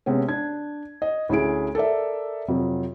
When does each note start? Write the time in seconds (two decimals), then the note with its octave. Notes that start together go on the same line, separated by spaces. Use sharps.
0.06 C3 G#3 B3 C#4
0.29 D4 G#6
1.02 D#5
1.29 D2 C#4 E4 G#4 D7
1.75 A4 A#4 D5 E5
2.48 F2 C3 F#3